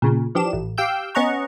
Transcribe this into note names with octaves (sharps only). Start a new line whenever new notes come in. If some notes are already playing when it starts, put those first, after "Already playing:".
A#2 C#3
E3 F3 D4 G4 E7
A1
G4 F5 G5 E6 G6
B3 C#4 D#5 F#5 A#5 C#6